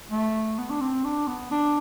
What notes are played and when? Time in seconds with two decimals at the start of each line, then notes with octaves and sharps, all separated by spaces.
0.11 A3
0.58 B3
0.70 D4
0.81 C4
1.05 D4
1.27 B3
1.51 D4